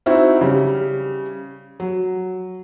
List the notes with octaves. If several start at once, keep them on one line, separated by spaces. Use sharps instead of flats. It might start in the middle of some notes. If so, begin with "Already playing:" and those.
C4 D#4 E4 F#4
C#3 G3
F#3